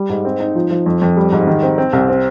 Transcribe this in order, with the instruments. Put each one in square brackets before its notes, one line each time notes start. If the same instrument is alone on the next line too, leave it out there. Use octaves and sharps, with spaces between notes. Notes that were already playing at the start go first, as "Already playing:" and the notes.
Already playing: [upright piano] G3
G#2
C4
D#4
F3
F3
F2
F2
G3
G#2
D#3
C4
C4
C2
C4